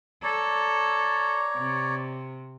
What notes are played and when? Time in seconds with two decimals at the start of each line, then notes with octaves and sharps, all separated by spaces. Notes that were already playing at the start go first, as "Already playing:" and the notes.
0.23 A4 C#5 D5 A#5
1.57 C3